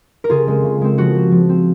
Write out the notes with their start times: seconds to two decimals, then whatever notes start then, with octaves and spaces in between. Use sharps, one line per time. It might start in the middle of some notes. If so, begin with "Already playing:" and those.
0.24 A#4
0.30 C#3 F4 G#4
0.48 G#3 C4
0.64 C#3
0.81 G#3 C4
0.98 F3 F#4
1.15 C4
1.32 F3
1.49 C4